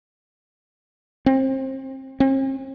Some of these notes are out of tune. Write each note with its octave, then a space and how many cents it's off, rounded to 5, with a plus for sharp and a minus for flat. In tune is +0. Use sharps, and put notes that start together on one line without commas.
C4 +30
C4 +45